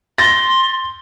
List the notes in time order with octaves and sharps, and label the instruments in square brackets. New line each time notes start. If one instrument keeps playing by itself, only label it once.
[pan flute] C6 [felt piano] A6 A#6